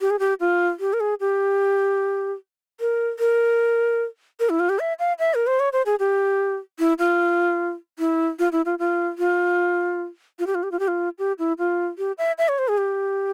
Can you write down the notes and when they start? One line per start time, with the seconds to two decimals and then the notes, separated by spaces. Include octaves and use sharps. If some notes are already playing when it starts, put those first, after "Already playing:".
0.01 G4
0.10 G#4
0.19 G4
0.40 F4
0.80 G4
0.93 A#4
1.00 G#4
1.20 G4
2.80 A#4
3.19 A#4
4.40 A#4
4.50 E4
4.60 F4
4.69 G4
4.79 E5
4.99 F5
5.19 E5
5.34 A#4
5.47 C5
5.60 C#5
5.73 C5
5.86 G#4
5.99 G4
6.79 E4
6.99 F4
7.99 E4
8.39 F4
8.52 E4
8.66 F4
8.79 F4
9.18 F4
10.39 F4
10.47 G4
10.55 F4
10.63 G4
10.72 F4
10.79 G4
10.88 F4
11.19 G4
11.39 E4
11.58 F4
11.98 G4
12.18 E5
12.38 E5
12.48 C#5
12.58 C5
12.68 G#4
12.78 G4